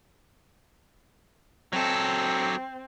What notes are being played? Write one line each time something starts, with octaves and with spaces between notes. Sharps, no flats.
F#3 C4 A4